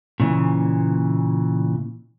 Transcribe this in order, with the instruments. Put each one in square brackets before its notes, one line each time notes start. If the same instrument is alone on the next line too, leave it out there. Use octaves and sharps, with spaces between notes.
[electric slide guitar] A#2 C#3 E3